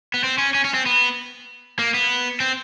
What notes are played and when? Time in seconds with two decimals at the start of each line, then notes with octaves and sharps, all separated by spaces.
0.14 B3
0.24 C4
0.38 C#4
0.55 C#4
0.65 C#4
0.74 C4
0.86 B3
1.79 A#3
1.94 B3
2.40 C4